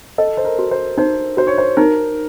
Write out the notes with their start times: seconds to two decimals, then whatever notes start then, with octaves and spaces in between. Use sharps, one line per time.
0.18 A4 D#5
0.37 C5
0.45 A#4
0.59 F#4
0.71 C5
0.98 D#4 C5
1.37 F#4 C5
1.47 C#5
1.58 C5
1.77 D#4 A#4